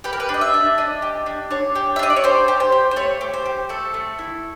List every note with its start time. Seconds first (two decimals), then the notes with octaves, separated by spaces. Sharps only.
0.04 G4 B4
0.13 A#4
0.20 B4
0.29 D4
0.34 D#5
0.41 E5
0.54 D4
0.78 D4 D#5
1.02 G4
1.26 D4
1.51 D4 C#5
1.75 G4
1.96 E5
1.99 D4 D#5
2.10 D5
2.16 C#5
2.24 G4 C5
2.48 G4
2.60 C5
2.72 G4
2.91 C5
2.96 A3 C#5
3.21 G4
3.34 C5
3.45 G4
3.69 A3 A4
3.94 A3
4.19 E4